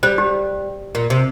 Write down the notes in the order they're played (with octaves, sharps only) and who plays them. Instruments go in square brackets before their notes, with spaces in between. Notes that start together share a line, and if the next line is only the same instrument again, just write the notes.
[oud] G3 [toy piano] C5
[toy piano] G4
[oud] A#2
C3